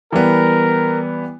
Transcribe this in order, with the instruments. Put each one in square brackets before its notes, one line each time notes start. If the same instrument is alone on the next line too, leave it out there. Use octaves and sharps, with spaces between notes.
[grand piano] E3 G3 B3 [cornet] A#4